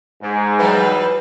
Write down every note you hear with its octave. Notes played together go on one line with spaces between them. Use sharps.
G#2
E3 F#3 G3 B4